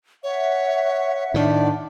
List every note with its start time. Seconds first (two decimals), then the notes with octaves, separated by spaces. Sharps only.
0.23 C#5 E5 F#5
1.34 A2 D#3 D4 D5